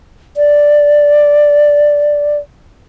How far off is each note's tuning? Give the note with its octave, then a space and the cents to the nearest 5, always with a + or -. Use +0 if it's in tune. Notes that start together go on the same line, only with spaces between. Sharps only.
D5 +0